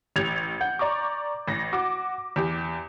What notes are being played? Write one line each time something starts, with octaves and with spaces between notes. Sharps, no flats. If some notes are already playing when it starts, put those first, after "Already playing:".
A1 G4 G#6 F7
F#5 G6
D5 A#5 C#6 D6
A1 A#6
F#4 D6
E2 G4